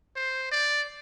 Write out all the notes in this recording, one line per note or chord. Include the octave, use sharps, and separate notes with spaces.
C5
D5